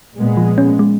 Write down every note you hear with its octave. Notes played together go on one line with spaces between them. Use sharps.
A#2 G#3 B3
F3
C#4
G#3